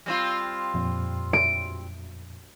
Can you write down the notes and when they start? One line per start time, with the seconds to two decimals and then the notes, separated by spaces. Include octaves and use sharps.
0.06 G3 C4 F4
0.74 F2 A#2
1.33 D7